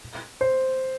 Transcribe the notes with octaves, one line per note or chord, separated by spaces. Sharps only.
C5